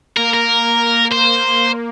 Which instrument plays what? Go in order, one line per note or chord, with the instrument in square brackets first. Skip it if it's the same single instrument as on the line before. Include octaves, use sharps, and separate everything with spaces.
[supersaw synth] A#3 [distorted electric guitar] A#4
[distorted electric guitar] A#4
C5